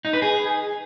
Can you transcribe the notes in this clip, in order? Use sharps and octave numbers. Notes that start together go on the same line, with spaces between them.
D#4
B4
G#4